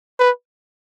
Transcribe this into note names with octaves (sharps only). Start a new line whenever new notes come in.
B4